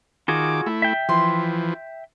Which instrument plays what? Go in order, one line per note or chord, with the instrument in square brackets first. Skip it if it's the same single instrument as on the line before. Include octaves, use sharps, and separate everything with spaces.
[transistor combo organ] D#3 D6 [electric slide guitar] F4 F#4 G#4
[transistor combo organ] A3 E4
[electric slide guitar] E5 G5
[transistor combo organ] E3 F3 [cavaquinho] C6